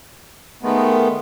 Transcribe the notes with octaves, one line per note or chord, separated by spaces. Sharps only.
D#3 G#3 A3 B3